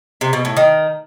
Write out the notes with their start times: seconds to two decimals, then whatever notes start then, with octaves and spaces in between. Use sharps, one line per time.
0.21 C3
0.33 B2
0.45 A2
0.57 D#3